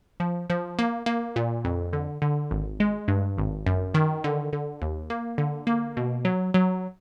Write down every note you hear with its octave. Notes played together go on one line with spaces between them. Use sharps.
F3
F3
A#3
A#3
A#2
F2
D3
D3
G#1
G#3
G2
G#1
F#2
D#3
D3
D3
D#2
A#3
D3
A#3
B2
F#3
F#3